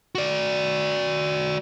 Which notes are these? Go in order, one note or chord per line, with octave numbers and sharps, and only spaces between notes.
F#4 D5